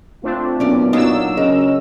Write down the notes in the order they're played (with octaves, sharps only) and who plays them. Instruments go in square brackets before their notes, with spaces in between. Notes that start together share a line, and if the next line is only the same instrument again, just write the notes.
[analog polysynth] A3 C4 D4 [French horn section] F4
[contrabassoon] B1 [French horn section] A#2 [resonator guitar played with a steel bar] C#4 D5
[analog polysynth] F#3 E6 [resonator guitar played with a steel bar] D4 D#4 F4
[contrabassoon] C#3 [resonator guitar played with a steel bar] A#4 [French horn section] D#5